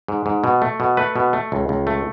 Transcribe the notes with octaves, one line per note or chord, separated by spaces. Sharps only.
G#2
G#2
B2
A3
B2
A3 B4
B2
A3
C#2
C#2
A3